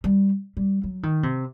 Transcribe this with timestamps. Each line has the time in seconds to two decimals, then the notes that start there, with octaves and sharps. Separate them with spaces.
0.04 G3
0.57 G3
0.83 F#3
1.03 D#3
1.23 C3